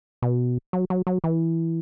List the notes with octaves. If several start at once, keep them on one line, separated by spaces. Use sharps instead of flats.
B2
F#3
F#3
F#3
E3